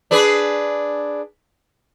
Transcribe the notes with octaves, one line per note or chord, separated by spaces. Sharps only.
D4 G#4 B4